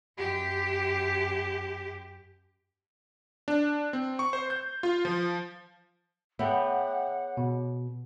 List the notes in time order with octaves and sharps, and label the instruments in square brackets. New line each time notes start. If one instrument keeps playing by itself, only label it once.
[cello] F#2 G4
[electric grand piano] D4
C4
C#6
C5
G6
F4
F3
[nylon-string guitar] B3 [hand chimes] G#4 C#5 [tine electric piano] E5 G5 [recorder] F#5
[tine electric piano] B2